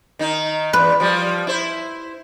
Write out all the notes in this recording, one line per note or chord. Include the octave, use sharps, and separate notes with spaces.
D#3 D#4
E2 B4
F3 G3
E4 C5